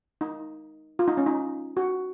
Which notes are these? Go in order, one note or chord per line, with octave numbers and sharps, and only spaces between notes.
D#4
F4
D#4
C#4
D#4
F#4